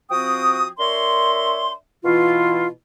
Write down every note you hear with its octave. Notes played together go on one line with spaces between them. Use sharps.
F3 C4 F#4 G5 D#6
D4 A#4 C#5 E5 C6
B2 E3 E4 F4